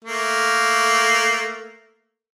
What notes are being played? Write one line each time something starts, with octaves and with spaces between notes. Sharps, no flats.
A3 A#3